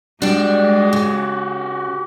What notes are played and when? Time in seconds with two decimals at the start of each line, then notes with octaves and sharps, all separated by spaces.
0.22 G3 G#3 D4 F#4 G4
0.93 C#3